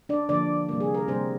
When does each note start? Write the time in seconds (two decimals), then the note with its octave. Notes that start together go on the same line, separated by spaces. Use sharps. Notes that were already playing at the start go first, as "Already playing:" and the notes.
0.09 D4 D5
0.29 D3 F3 A#3 D4 D5
0.69 C3 G3 A#3
0.80 G#4
0.94 A#4
1.08 C3 G3 A#3 C4 C5